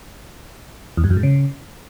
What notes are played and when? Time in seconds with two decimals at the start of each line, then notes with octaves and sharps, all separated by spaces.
0.97 E2
1.04 G2
1.10 F#2
1.17 G#2
1.23 C#3